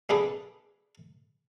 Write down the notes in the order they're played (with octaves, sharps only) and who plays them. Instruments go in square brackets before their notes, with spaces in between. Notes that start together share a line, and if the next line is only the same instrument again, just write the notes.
[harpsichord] A#3 D4 G#4 A4 B4